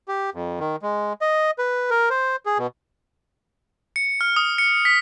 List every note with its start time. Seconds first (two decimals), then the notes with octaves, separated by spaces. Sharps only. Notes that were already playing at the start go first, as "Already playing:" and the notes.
0.08 G4
0.34 F2
0.60 D#3
0.82 G#3
1.21 D#5
1.59 B4
1.90 A#4
2.10 C5
2.46 G#4
2.58 B2
3.96 C#7
4.21 F6
4.36 D#6
4.58 C#7
4.85 B6